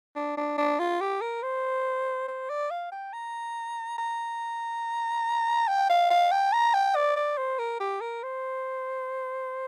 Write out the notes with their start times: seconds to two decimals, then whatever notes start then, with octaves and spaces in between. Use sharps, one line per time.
0.16 D4
0.37 D4
0.58 D4
0.79 F4
1.00 G4
1.21 A#4
1.43 C5
2.28 C5
2.50 D5
2.71 F5
2.92 G5
3.13 A#5
3.98 A#5
5.68 G5
5.89 F5
6.10 F5
6.32 G5
6.53 A#5
6.74 G5
6.95 D5
7.16 D5
7.38 C5
7.59 A#4
7.80 G4
8.01 A#4
8.23 C5